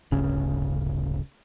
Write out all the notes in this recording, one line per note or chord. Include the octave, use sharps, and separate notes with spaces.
D1 G1 C#3 C#4